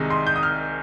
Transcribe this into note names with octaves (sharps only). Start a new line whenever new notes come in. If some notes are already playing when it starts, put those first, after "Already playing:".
Already playing: C2 C3 D#3 G#3 D#4
C6
G6
D#6
F6